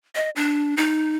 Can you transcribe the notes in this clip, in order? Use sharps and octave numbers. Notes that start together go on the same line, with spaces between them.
D#5
D4
D#4